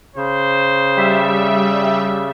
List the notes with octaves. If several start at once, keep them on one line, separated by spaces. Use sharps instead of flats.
C#3 C5
G3 E5